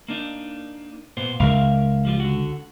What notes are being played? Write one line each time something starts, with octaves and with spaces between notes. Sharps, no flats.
A#3 D4 D#4
A#2 B3 C5
C#2 A#4 E5 F5
F3 G3 F4
D3 F#4